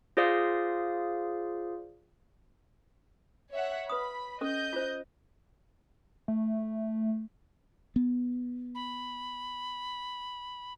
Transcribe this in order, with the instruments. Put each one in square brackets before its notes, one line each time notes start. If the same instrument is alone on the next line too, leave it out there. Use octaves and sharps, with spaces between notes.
[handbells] F4 G#4 C5 D5 F5 D#6
[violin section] C#5 E5 F#5
[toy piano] B4 D#6 [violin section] B5
[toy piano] C#4 A4 [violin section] D#5 G6
[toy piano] F4 C5
[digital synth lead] A3
[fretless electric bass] B3
[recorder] B5